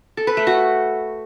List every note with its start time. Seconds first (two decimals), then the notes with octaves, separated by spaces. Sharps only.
0.17 A4
0.27 B4
0.37 A3
0.47 F#4